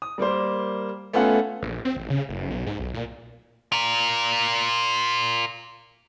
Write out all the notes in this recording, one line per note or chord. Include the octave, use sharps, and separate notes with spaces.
D#6
G3 A#3 A#4 C5
A3 B3 C#4 F4 A4 F#5
A#1
C4
A1
C#3
F#1
B1
G#2
B1
A#2
F4 A#4